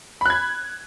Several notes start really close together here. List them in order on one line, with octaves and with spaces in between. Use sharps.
B5 F#6 G#6